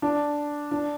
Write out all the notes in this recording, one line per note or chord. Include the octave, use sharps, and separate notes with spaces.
D4
D4